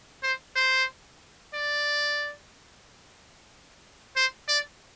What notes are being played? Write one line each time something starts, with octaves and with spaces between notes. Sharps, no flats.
C5
C5
D5
C5
D5